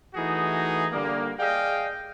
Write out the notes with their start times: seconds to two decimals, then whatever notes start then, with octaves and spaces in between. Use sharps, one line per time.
0.15 E3 A3 D#4 F#4 G#4
0.92 D3 G3 A#3
1.38 G#4 D5 D#5 F5 G5